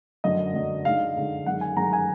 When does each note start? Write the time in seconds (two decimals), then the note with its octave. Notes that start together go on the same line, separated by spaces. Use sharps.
0.24 F#2 D3 F#3 D4 D#5
0.54 F#2 D3 F#3 D4
0.85 D3 G#3 D#4 F5
1.16 D3 G#3 D#4
1.46 F#2 D#3 G#3 F#5
1.61 G#5
1.77 F#2 D#3 G#3 A#5
1.93 G#5